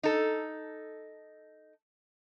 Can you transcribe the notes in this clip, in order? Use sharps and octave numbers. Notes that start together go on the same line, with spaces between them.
D#4 A4